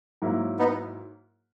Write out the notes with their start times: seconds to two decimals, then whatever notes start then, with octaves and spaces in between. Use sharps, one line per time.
0.22 G#2 F#3 A#3 E4
0.59 B3 D#4